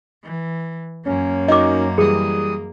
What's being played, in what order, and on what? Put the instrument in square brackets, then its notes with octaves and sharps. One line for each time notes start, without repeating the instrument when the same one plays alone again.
[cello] E3
[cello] F#2 A#3 [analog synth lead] C#4
[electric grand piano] D#4 F#4 A#4 [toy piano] D#5 D6
[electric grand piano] E3 G3 [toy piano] G#4 [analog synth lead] D#6